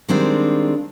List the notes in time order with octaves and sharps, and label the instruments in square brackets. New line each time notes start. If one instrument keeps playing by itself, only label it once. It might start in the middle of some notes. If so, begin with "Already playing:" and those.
[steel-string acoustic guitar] D#3 G3 G#3 C4 D4 F4